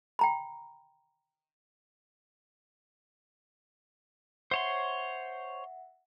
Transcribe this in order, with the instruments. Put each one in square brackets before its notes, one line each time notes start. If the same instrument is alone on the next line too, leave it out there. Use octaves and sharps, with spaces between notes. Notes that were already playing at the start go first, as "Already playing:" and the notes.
[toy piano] G5 A#5 B5
[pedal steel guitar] C5 C#5 C6 [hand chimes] E5 F#5